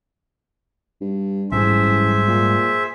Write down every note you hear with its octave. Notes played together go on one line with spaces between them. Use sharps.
G2
A1 G#2 F#3 G3 G#4 C5 E5
A#2